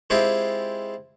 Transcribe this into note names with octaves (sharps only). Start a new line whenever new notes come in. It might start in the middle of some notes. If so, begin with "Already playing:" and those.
G#3 C4 E4 F4 G4